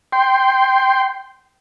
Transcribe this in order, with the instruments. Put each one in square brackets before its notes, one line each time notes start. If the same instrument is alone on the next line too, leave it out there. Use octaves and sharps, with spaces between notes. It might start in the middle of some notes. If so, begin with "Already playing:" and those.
[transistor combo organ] G5 C6